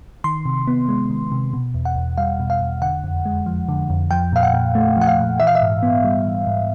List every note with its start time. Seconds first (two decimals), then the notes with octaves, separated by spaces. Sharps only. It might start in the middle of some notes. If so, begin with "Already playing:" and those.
0.24 D#3 C6
0.46 C3
0.67 B3
0.89 G#3
1.10 D#3
1.32 C3
1.54 B2
1.74 E2
1.85 F#5
1.95 E2
2.18 G3 F5
2.40 B2
2.50 F5
2.61 E2
2.82 D3 F#5
3.04 F2
3.26 G#3
3.46 F3
3.68 D3
3.90 F2
4.11 F3 G5
4.33 A#2 F5
4.43 F#5
4.54 A#2
4.75 A3
4.97 F3 F#5
5.07 F5
5.19 A#2
5.40 E3 E5
5.47 F5
5.55 E5
5.62 G#2
5.83 B3
6.04 G3
6.25 E3
6.47 G#2